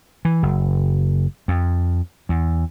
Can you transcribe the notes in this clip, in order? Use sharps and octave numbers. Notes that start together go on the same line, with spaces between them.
E3
F#1
F2
E2